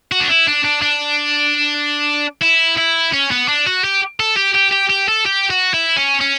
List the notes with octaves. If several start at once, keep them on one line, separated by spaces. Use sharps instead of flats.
F#4
D4
E4
D4
D4
D4
E4
E4
C#4
B3
D4
F#4
G4
A4
G4
G4
G4
G4
A4
G4
F#4
E4
C#4
C#4